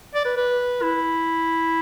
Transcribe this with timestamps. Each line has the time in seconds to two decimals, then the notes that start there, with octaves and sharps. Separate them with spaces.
0.14 D5
0.25 B4
0.37 B4
0.82 E4